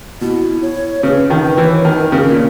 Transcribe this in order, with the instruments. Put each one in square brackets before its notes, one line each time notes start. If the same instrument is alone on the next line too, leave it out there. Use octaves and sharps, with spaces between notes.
[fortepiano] B2 [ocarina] E4
[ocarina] C#5
[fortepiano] C#3 [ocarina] B4
[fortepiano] D#3
[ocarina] B4
[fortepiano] E3
[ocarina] C#5
[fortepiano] D#3 [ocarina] A#4
[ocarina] B4
A#4
[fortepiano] C#3
A#2